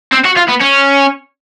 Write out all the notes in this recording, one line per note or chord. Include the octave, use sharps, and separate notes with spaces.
C4
F#4
F4
B3
C#4